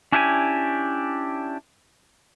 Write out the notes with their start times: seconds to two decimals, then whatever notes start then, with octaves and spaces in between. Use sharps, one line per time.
0.12 C#4 D4 E4 G4 F#5 G#5